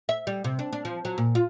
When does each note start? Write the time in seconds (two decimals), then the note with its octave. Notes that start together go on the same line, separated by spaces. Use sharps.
0.09 E5
0.27 G3
0.44 C3
0.59 D4
0.73 D4
0.85 F3
1.05 F#3
1.18 A#2
1.35 F4